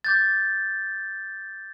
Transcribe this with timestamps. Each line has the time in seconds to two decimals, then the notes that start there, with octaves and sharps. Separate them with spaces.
0.04 D6 G6 A6